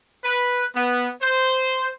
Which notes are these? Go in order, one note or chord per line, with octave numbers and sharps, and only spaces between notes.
B4
B3
C5